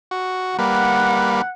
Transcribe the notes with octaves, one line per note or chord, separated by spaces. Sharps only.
F#4
G3 A#3 B4 F#5